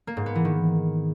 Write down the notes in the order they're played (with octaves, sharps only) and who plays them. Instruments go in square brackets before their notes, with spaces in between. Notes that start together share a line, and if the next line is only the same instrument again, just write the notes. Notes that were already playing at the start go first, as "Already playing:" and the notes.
[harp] A#3
G#2
B3
E3
D#3